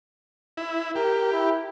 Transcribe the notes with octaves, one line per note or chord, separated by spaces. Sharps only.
E4
G4 A#4
E4